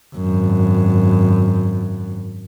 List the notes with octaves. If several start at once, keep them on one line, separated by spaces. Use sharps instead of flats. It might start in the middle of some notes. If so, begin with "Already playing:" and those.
G#1 F#2